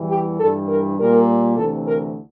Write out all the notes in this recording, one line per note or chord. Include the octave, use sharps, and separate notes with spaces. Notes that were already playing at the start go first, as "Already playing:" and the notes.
Already playing: E2 E3 G3
G4
G2 E3 G3 A4
A#4
A#2 G3 A#4
D2 C3 E3 A4
A#4